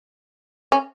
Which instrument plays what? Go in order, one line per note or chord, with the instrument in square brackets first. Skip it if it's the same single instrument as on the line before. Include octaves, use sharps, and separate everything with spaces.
[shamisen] C#4